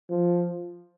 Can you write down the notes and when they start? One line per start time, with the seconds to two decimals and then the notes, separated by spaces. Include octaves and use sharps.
0.10 F3